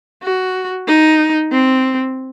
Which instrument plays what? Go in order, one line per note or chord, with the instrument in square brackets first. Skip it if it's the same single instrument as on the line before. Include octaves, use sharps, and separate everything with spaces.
[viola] F#4
D#4
C4